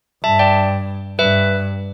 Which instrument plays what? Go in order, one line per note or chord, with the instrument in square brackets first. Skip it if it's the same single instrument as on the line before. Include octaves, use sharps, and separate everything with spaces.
[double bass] G2 [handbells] E5 A5
[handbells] D5 G5
[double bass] G2 [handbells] B4 E5